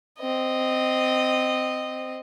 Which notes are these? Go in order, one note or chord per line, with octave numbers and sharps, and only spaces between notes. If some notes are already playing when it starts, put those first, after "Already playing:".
C4 D#5